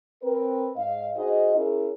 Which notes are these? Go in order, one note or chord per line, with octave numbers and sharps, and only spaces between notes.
C4 A#4 B4
G#2 D#5 F5
D#4 F#4 G#4 C5 D#5
C#4 E4 G#4 A#4